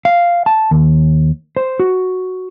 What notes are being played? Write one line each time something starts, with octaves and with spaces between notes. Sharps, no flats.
F5
A5
D#2
C5
F#4